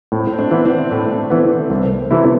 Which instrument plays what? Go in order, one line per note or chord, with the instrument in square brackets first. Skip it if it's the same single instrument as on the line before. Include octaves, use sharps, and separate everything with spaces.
[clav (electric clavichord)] A2 [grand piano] C4
[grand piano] C4
D4
[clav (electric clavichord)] E3 B3
[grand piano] C4
[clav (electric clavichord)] A2 [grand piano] A3
[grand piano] A3
[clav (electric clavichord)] E3 B3 [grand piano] C4
[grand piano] C4
[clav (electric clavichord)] C2 [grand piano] B3
[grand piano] C4
[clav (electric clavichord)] C3 E3 A3 E4
[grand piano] B3